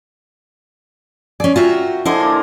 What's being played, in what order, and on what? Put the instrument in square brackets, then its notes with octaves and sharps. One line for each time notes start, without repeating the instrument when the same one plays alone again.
[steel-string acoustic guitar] C#4 D5 [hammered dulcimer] G#4
[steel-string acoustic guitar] F4 F#4 E5 [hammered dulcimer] A#4 G5
[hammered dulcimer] D3 F3 G#5 [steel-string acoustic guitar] E4 C5 D#5
[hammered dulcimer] A#3 F4